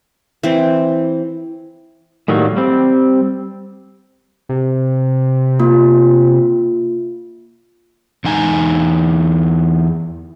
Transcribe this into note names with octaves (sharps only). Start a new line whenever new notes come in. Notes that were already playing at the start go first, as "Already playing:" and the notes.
E3 C4
A2 D#3 F#3 G3 A#3
G3 C4
C3
A#3 F4
E2 D#4 G#5 A#5